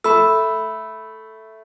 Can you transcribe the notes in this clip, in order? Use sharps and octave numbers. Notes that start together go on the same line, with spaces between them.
A3 B5 E6